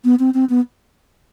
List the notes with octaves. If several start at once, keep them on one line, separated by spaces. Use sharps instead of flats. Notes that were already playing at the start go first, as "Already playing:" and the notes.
B3
C4
C4
B3